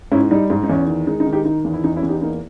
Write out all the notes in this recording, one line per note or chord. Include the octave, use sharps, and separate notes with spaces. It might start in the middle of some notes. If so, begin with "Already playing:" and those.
G#2 C#4 E4
G3 D#4
G#2
D#4
E2 C#4
D#3
G#3 D#4
D#4
D#3
D#4 G4
D#3 D#4
E2
E4
E2 D#4
C#4 E4
E2
D#4 G4
A#3 D#4